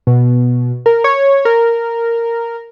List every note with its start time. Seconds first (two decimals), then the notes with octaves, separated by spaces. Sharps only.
0.07 B2
0.86 A#4
1.04 C#5
1.45 A#4